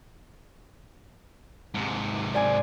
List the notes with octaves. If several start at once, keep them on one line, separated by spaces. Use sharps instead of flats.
G#2 C3
C5 D5 G#5